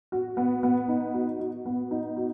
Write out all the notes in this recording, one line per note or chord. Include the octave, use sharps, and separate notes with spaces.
F#4
B3
B3
D#4
F#4
F#4
B3
D#4
F#4